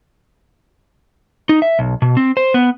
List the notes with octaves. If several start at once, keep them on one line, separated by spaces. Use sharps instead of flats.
D#4
E5
B1
B2
C4
C5
B3